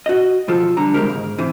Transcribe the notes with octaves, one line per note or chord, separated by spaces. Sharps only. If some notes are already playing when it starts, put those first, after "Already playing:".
F#4 D#5
B2 F3 F4 A4
D3 G3 A#5
C2 C3 G#3 G4 A#4
G#2 C#3
A2 C3 E3